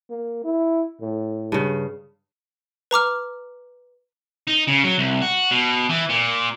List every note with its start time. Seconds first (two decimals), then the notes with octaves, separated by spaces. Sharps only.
0.10 A#3
0.44 E4
1.01 A2
1.52 G2 C#3
2.91 B4 A#5 D6 F6
4.47 D#4
4.67 C#3
4.84 F#3
4.98 C2
5.21 F#4
5.51 B2
5.90 E3
6.09 A#2